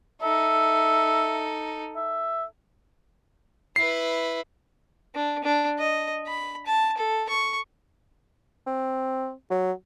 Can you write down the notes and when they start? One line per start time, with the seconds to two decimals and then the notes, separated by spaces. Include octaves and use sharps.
0.22 D#4 A4 E5
1.96 E5
3.76 E4 B4 C7
5.15 D4
5.44 D4
5.79 D#5
6.27 B5
6.66 A5
6.98 A4
7.29 C#6
8.66 C4
9.50 F#3